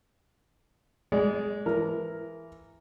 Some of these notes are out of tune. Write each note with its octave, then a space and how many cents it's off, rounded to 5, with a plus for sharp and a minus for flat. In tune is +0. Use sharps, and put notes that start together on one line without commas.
G#3 +0 D5 -35
E3 +10 A#4 +0